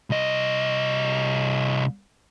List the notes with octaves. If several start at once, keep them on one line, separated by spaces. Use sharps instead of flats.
C2 D#5